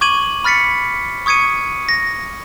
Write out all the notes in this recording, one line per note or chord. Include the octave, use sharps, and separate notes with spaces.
C#6 D6 G#6 D#7 F#7
B5 F6 A6 B6 C#7
C#6 D#6 G#6 C#7 D#7
A#6